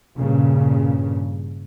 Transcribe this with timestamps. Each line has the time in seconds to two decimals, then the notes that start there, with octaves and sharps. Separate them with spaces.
0.17 G2 A#2 C#3